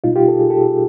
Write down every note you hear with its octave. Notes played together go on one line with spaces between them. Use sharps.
B2 G3 B3 D#4 F4
F4 G4
A4
G#4
G4 A4